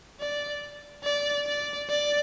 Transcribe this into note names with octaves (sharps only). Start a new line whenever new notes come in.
D5
D5
D5
D5